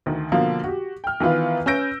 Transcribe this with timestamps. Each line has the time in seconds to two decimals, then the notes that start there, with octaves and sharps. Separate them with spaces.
0.06 D2 D#3
0.32 B2 D3 F3 A#3
0.64 F#4 G4
1.04 G5 F6
1.20 D#3 E3 B3 F4 B4
1.66 C#4 B4 E6 G6 A#6 D7